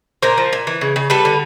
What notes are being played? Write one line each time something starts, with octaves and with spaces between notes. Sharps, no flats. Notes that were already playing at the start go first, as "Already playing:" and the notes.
A#2 A#4 C5
F3
A#2
E3
C#3
C#3
G3 A4 B4
D3